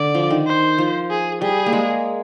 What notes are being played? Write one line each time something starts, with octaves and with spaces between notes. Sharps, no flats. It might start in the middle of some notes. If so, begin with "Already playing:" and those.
Already playing: D3 D5
F3
D#3
C5
F3
G#4
G3 G#4
A#3
G#3